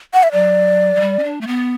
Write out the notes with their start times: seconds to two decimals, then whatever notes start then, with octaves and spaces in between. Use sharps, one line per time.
0.14 F#5
0.23 E5
0.32 F#3 D5
0.96 F#3
1.00 G3
1.19 C#4
1.24 D4
1.41 A3
1.47 B3